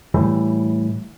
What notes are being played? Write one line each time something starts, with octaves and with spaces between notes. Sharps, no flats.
A2 E3 G3